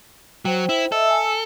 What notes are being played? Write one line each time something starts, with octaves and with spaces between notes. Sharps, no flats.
F#3 C5 G5
E4
A4 D#5 E5 E6
G#5 E6